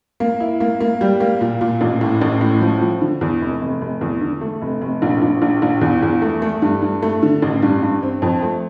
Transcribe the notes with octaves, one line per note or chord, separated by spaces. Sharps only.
A#3
E4
A#3
A#3
G3
A#3
A#2
A#2
A1
A2
A1
A2
F3
F3
D3
E2
F1
F1
F1
E2
D3
A3
F1
F1
A#1
A#1
A#1
A#1
E2
E2
A3
A3
G2
G2
A3
D3
A1
G2
G2
C4
F2
A3